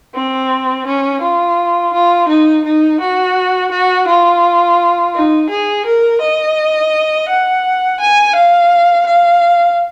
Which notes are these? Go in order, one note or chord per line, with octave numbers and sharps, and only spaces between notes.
C4
C#4
F4
F4
D#4
D#4
F#4
F#4
F4
D#4
G#4
A#4
D#5
F#5
G#5
F5
F5